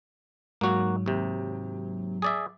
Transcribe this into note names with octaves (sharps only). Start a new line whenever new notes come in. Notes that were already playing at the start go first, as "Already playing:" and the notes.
G#2 F#3 A#3 F#4
D#2 C3
G#4 D5 E5